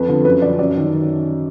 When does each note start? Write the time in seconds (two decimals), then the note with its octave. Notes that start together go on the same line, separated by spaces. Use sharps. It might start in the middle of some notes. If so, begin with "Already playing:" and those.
Already playing: F2 B4
0.08 D3 F3
0.25 F#2 B4
0.42 F3 D5
0.59 F#2 D5
0.76 D#3